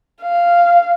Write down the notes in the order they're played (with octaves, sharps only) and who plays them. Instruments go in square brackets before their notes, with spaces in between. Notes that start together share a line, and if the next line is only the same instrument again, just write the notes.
[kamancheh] F5